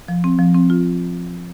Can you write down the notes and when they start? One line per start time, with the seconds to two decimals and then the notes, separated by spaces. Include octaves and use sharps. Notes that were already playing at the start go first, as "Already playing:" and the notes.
0.08 F3
0.24 C4
0.39 F3
0.54 C4
0.70 F4